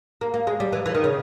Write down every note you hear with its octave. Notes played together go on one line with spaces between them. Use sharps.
A#3
A#3
G#3
G3
E3
E3
D#3
C#3